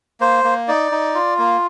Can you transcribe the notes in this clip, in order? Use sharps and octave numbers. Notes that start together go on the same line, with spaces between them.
A#3 C5
A#3
D#4 D5
D#4
F4
A#3